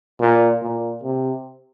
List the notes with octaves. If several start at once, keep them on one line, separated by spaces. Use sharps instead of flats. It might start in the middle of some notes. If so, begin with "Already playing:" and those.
A#2
A#2
C3